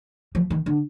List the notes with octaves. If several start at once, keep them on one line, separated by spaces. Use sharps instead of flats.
F3
D#3
D3